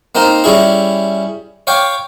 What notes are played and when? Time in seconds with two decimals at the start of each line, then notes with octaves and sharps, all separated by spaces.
0.15 A#3 C4 D#4 A#4
0.44 G3 C#4 E4 G#4
1.67 C#5 F5 G5 D6